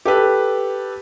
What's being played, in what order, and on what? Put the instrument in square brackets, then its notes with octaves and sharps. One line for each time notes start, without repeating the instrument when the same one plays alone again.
[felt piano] G4 A4 B4